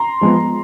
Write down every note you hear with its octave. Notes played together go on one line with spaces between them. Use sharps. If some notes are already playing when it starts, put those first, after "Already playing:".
Already playing: A#5 C6
F3 G#3 B3